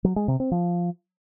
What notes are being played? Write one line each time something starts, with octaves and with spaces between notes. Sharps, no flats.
F#3
G#3
C3
C4
F3